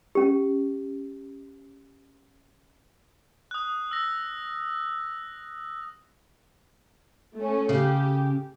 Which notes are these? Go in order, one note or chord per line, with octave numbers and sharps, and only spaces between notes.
C#4 G4
D#6 F#6
E6 A#6
A3 C#4
C#3 G4